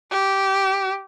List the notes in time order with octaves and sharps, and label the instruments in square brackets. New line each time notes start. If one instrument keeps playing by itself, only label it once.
[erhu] G4